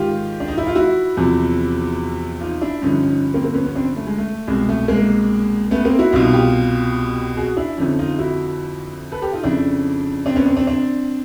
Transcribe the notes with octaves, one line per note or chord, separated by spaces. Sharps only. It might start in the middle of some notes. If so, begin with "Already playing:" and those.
Already playing: G#2 D#3 F4 G4
D4
D#4
E4
F4
E4 F#4
E2 C3 F3
D#4 F4
D4 E4
G2 D3 F3 C#4 D#4
C#4 D#4
A#3 C4
A#3 C4
B3 C#4
B3 C#4
C4 D4
A3
G#3
A3
C2 B2 G#3
A3
G#3 A#3
A3 B3
A#3 C4
E4 F#4
C2 B2 D#4 F4
F4 G4
F#4 G#4
D4 E4
F2 D3 F3 C#4 D#4
D#4 F4
E4 F#4
A4 B4
G4 A4
D#4 F4
F2 C#3 F3 D4 E4
C4 D4
B3 C#4
C4 D4
C4 D4
C4 D4